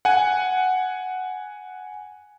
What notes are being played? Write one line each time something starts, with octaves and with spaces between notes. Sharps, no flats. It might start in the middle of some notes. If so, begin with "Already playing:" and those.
F#5 G#5